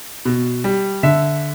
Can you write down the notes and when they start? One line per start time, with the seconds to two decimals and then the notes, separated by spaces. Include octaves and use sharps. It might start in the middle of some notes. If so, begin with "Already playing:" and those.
0.25 B2
0.64 G3
1.03 D3 E5